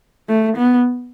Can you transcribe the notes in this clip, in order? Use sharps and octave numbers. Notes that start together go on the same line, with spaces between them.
A3
B3